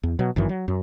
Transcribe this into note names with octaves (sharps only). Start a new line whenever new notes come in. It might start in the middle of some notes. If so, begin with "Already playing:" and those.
E2
B2 F#3
G1 F#2 D#3 E3
F#3
F#2